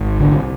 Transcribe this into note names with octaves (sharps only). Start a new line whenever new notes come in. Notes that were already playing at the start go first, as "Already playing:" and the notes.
Already playing: G#1
C2 D3